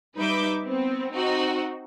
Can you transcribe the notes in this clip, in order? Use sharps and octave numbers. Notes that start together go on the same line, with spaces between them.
G3 D#4 B4 E5 D6 G6
B3 C4
C4 D#4 F#4